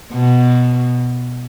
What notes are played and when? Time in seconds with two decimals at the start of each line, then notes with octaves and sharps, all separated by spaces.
0.13 B2